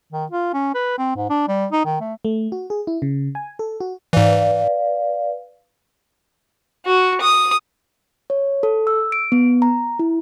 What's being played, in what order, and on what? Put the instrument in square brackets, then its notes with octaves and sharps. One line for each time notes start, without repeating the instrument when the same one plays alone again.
[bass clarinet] D#3
F4
C#4
B4
C4
G#2
D4
G3
D#4
D#3
A3
[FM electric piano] A3
F#4
G#4
E4
C#3
G#5
A4
F#4
[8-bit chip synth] G#2 E3 [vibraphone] B4 D5 F5
[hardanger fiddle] F#4
D#6
[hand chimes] C#5
A4
E6
D7
B3
A#5
E4